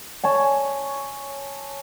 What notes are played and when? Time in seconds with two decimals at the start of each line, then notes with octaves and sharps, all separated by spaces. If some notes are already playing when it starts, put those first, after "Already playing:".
0.24 C#5 G#5 A5